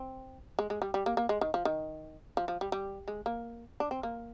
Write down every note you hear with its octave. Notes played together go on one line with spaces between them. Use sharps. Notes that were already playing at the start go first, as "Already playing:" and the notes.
Already playing: C4
G#3
G#3
G3
G3
A#3
A#3
G#3
D#3
F3
D#3
F3
F3
G3
G3
G#3
A#3
D4
C4
A#3